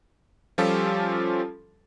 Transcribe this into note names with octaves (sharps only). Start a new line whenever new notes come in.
F3 G3 C#4 F4 G4 A4